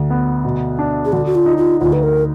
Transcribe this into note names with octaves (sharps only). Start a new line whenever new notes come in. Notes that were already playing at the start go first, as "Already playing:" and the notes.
Already playing: D2
B3
B2
D4
G#4
D3 F#4
F#4
F4
D#4
F4
D2 F4
B4
A#4